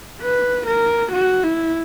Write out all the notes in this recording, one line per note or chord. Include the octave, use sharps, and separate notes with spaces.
B4
A#4
F#4
E4